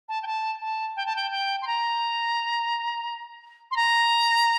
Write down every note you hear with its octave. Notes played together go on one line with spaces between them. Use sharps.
A5
G5
A5
A5
G5
A5
G5
G5
C6
A#5
C6
A#5